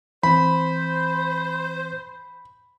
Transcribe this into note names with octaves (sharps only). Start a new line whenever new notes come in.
E3 C4 C5 B5